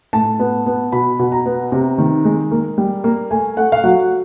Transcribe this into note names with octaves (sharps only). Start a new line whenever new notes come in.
A2 A5
B3
B3
B2 B5
B2
A#5
B3
C3
D#3
G#3
A#3
G3
A#3
A3 G#5
A3 F#5
F5
F#3 F#5